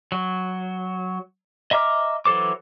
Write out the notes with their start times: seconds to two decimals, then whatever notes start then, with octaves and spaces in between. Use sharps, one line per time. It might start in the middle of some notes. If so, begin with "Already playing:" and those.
0.12 F#3
1.71 D#5 E5 A#5 D6 F6
2.26 E3 F#3 A4 C5 D6